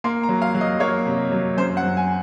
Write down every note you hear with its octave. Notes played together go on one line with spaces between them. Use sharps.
A#3 C6
A#5
F#3
F5
F#3
D#5
A#3 C#5
C3
F#3
F#2 C5
F#5
F#2
G#5